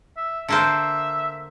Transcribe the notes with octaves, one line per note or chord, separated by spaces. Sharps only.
E5
D3 A#3 C5 E5